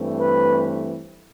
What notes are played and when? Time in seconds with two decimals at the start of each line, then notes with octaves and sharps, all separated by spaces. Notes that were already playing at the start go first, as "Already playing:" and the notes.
Already playing: G2 E3 A3 C4
0.20 B4